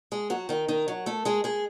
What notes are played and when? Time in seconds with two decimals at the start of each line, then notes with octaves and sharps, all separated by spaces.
0.12 G#3 G#4
0.30 F#3 F#4
0.49 D#3 D#4
0.68 D#3 D#4
0.88 F#3 F#4
1.06 A3 A4
1.25 G#3 G#4
1.44 G#3 G#4